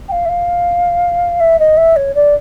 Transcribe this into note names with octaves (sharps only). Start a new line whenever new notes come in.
G5
F5
E5
F5
E5
D#5
E5
C#5
D5